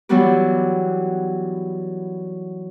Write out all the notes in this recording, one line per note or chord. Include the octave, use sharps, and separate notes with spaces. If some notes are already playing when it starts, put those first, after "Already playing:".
E3 F#3 G3 B3 G4